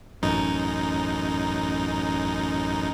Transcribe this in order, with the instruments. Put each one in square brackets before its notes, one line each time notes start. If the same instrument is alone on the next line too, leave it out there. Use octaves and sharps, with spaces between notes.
[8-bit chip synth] A1 F#2 D#4